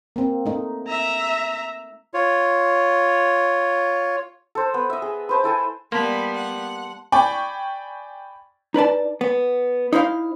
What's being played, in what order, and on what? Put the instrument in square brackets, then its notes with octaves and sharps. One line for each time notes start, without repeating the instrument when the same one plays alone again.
[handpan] A#3 C4
A3 D#4
[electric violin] E5 A#5
[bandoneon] F4 C#5
[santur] A4 C5
B3
D#5 E5
G#4
B4 C5 A5
E4 A4 G#5
[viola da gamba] G3 B3 [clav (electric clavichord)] A#3 [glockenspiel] A5 C6 [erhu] B5
[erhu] F#5
[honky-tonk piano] D5 G5 G#5 B5 C#6 D6
[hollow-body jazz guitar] D#4 B4 D5 A5
B3
D#4 E4 C5 F5